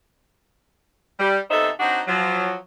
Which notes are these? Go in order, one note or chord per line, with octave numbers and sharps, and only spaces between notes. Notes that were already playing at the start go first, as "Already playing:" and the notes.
G3
C3 B3 D#4 A4 C5 E5
F#3 C4 D4 D#4 F#4
F3 F#3